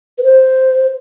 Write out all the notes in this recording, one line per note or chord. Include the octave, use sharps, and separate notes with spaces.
B4
C5